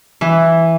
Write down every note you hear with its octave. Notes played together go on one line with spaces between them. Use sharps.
E3